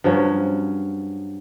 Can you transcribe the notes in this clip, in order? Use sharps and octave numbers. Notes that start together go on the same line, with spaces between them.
G2 F3 F#3 C#4